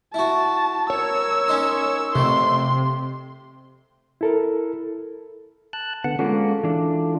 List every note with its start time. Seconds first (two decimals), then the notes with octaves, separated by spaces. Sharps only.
0.14 E4 F#4 A5
0.90 A#4 C#5 E6
1.48 C#4 D#4 C6
2.15 F2 C3 A3 C6
4.21 E4 A4 A#4
5.73 A5 F#6
6.04 D3 B3 F#5
6.19 G#3 A#3 C#4 F4 A4
6.63 E3 D4